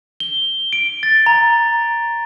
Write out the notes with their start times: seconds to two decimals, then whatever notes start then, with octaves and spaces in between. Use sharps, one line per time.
0.20 G7
0.73 D7
1.03 A6
1.26 A#5